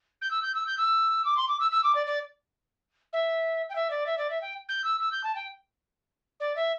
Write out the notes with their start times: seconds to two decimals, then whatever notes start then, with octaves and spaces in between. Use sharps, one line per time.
0.21 G6
0.31 E6
0.42 G6
0.54 E6
0.66 G6
0.77 E6
1.25 D6
1.37 C6
1.48 D6
1.60 E6
1.71 E6
1.83 D6
1.94 D5
2.06 D5
3.13 E5
3.69 G5
3.75 E5
3.90 D5
4.06 E5
4.17 D5
4.30 E5
4.41 G5
4.68 G6
4.84 E6
5.00 E6
5.11 G6
5.23 A5
5.35 G5
6.40 D5
6.55 E5